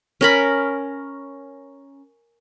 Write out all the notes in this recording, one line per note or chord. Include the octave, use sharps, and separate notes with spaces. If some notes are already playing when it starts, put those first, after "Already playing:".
C#4 A#4 B5